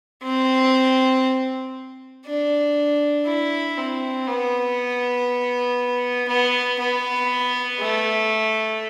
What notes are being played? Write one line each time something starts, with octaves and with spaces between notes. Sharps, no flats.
C4
D4
E4
C4
B3
B3
B3
A3